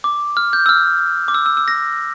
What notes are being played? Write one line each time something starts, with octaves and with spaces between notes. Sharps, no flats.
D6
F6
G6
E6
F6
D6
E6
E6
E6
A#6